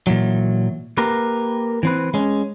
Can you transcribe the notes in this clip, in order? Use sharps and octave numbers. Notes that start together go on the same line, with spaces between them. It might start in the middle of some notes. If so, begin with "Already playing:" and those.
A#2 E3 F#3
A#3 G4 A#4 B4
E3 C4 B4
G#3 C#4